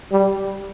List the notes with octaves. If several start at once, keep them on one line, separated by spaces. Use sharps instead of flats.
G3